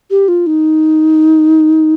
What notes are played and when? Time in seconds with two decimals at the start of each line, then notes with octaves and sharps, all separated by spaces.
0.11 G4
0.28 F4
0.47 D#4